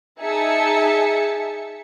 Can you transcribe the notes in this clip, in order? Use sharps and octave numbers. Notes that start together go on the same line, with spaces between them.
D#4 G#4 E5 G#5 A5 C#7